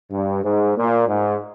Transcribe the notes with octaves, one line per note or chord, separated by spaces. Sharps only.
G2
G#2
A#2
G#2